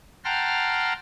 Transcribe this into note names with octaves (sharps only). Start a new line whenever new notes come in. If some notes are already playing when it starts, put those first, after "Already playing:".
F#5 G5 A5 A#5 C6 F6